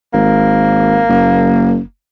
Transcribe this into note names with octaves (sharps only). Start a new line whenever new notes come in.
G#1 A#3
F#1